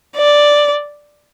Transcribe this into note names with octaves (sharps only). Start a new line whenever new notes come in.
D5